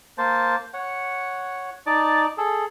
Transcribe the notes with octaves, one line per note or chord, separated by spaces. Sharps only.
A#3 C5 A5
C#5 F#5
D#4 D5 A5
G#4 A4